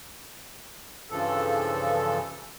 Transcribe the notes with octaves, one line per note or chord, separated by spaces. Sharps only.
G2 C#3 E3 F3 A4